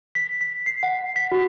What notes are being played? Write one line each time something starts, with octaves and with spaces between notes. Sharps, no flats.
B6
B6
C7
F#5
B6
F#4